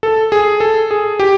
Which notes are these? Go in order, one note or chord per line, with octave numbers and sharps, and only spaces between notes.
A4
G#4
A4
G#4
G4